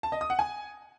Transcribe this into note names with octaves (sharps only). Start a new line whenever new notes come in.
A5
D#5
D#6
F#5
G#5